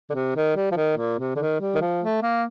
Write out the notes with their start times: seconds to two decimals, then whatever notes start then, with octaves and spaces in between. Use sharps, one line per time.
0.10 D3
0.14 C3
0.36 D#3
0.56 G3
0.71 F3
0.76 D#3
0.97 A#2
1.19 C3
1.36 D3
1.39 D#3
1.61 G3
1.75 D#3
1.81 F3
2.02 A3
2.22 A#3